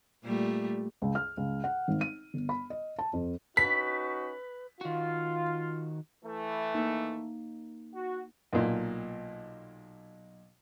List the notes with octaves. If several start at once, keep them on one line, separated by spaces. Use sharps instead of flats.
A#2 G3 A3
C#2
F6
C#2
F#5
G#1
D#7
G1
B5
D#5
A5
F2
C#4 D#4 F#4 B4 B6
D#3 F4 F#4
E3 A3
A#3 D#4
F#4
B1 A#2